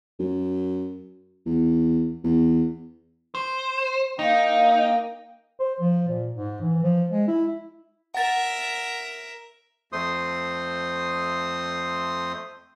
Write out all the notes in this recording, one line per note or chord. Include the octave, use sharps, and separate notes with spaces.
F#2
E2
E2
C5
A#3 D#4 G5
C5
F3
A#2
G#2
E3
F3
G#3
E4
A#4 E5 F#5 A6
F2 A3 C5 C6 D#6